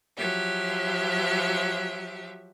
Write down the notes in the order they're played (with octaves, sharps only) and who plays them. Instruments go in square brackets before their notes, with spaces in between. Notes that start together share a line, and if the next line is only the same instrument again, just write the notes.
[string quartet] F3 F#3 G4 E5